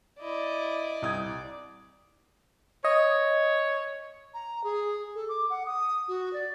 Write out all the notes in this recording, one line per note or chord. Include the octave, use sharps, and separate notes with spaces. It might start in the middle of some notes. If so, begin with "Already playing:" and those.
E4 D5 D#5
C2 D#6 G#6
C#5 D#5
A#5
G#4
A4
D6
F#5
D#6
F#4
D5